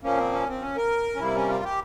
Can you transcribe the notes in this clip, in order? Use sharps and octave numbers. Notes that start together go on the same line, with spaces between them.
A#2 F3 A#3 C#4
C4
C#4
C4
C#4
A#4
C#4
C3 G3 A#3 E4
C#4
F4
G4